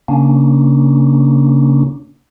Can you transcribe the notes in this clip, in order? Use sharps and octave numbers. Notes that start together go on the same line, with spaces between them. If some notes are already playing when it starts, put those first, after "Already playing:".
C#3 A#3 C#4 D4